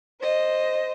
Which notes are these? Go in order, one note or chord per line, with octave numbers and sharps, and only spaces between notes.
C5 D#5